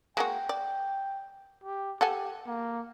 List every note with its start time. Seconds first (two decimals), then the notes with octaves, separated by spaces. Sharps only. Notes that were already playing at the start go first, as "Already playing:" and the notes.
0.17 G#3 A#3 F#4 G5
0.49 D5
1.64 G4
2.01 G4 A4 F#5 G#5
2.47 A#3